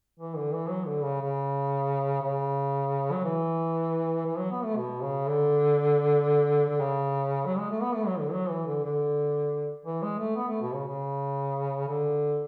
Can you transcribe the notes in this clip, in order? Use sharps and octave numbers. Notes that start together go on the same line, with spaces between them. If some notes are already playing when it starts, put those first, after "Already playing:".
E3
D3
E3
F#3
D3
C#3
C#3
C#3
F#3
E3
E3
F#3
B3
A3
B2
C#3
D3
D3
C#3
F#3
G#3
A3
B3
A3
F#3
D3
F#3
E3
D3
D3
E3
G#3
A3
B3
A3
B2
C#3
C#3
D3